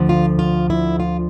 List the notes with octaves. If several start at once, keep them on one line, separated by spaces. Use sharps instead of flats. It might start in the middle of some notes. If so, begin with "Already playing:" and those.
Already playing: D2 D3 F3
F4
F4
E4
F4